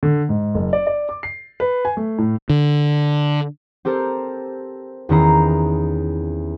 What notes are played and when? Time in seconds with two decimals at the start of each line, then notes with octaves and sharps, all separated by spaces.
0.03 D3
0.29 G#2
0.54 F#1
0.73 D5
0.87 D5
1.09 D6
1.23 C7
1.60 B4
1.85 G#5
1.97 A3
2.18 A2
2.50 D3
3.85 C4 G4 A4 A#4 C5
5.09 E2 D#3 C#4 E4 A#5 C7